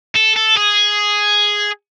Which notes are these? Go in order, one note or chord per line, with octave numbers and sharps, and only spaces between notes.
A4
A4
G#4